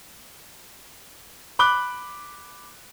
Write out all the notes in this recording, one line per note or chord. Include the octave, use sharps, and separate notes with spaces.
B5 D6 F#6 G7